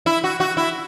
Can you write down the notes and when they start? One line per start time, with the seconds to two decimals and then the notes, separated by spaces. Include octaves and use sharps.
0.06 E4
0.24 F#4
0.40 F#4
0.57 E4